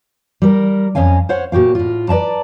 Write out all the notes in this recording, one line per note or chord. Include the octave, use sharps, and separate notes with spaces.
G3 A#4
F2 C#4 D#5 F5 G#5
C5 C#5 F5 F#5
A#2 F#4 G4 F5
A2 F4
B4 D5 E5 A5 A#5